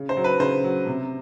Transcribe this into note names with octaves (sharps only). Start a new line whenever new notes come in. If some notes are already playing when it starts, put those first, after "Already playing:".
Already playing: C#3
C5
F#3
B4
C#3 C5
F#3
C3